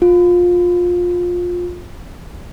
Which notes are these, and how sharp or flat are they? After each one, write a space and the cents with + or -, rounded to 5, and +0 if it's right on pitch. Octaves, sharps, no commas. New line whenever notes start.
F4 +20